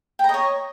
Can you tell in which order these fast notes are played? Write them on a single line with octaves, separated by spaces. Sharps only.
G5 A#5 D#5 C#5